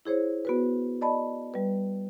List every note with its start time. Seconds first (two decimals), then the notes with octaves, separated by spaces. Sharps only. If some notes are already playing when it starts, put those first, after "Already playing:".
0.05 E4 G#4 C5 C#5
0.45 B3 F#4 B4
1.01 D5 D#5 A5 B5
1.54 G3 B4